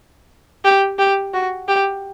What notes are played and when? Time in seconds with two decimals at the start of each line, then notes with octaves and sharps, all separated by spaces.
0.64 G4
0.99 G4
1.34 F#4
1.68 G4